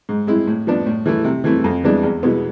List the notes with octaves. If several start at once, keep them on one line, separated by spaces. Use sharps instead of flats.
G#2
G#3 C4 E4
A2
F3 B3 D4
A2
E3 A3 E4
C3
E3 A3 C4 E4
F2
E3 G#3 B3 D4
E2
B2 G#3 B3 E4